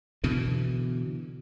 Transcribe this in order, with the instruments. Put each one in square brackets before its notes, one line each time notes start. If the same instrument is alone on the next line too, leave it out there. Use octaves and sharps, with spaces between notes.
[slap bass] B2 D3 E3